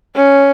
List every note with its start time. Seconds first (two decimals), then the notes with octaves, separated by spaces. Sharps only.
0.15 C#4